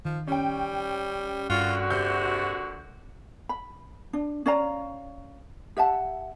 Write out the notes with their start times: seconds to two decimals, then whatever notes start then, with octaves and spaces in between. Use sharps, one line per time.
0.05 D#3 F3
0.27 G3 C#4 G5
1.50 G2 A#2 D3 F4 F#4
1.90 C3 G6
3.49 B5
4.13 D4
4.46 C#4 D5 F5 A#5
5.77 G4 E5 F#5 A5